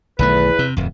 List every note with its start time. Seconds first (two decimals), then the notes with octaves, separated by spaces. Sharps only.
0.19 B1 E2 D#3 A3 B4
0.59 C3
0.77 D1 F2